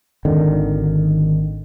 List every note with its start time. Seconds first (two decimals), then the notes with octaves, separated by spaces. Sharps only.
0.25 G#1 D3 D#3